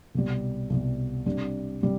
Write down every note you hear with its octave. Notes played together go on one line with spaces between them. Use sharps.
C2 B2 G3
C2 B2 G3
C3 G3 D4
C3 G3